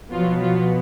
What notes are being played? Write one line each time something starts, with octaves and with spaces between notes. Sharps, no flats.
B2 F3 F#3 B3 F4
F3 F4